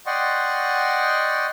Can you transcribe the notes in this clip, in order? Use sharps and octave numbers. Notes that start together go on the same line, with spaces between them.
D5 D#5 F#5 G5 C6 C#6